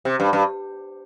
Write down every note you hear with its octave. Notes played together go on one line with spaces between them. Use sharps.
C3
G2
G2